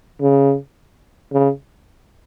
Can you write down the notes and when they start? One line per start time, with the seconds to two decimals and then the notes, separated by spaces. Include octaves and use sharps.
0.22 C#3
1.33 C#3